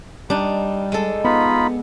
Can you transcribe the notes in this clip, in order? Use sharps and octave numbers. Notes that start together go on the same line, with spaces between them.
G3 D4 D#4
G#3 A4
B3 D#4 F4 B5